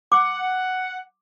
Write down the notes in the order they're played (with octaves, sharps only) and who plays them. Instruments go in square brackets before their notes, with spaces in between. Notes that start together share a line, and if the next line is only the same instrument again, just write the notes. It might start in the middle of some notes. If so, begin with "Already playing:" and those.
[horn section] F#5 [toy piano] D6